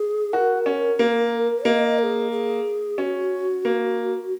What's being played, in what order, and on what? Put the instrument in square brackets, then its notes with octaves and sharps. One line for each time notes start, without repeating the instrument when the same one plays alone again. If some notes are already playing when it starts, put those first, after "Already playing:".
Already playing: [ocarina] G#4
[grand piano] F#4 [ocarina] A#4
[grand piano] C#4
A#3
[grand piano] A#3 [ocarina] D#5
[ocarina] A#4
G#4
G#4
[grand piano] C#4 [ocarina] F#4
[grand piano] A#3